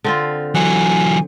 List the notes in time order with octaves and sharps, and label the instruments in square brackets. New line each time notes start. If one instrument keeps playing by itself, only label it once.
[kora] D3 C4 F4
[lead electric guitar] E3 F#3 [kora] F#5 [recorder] G#5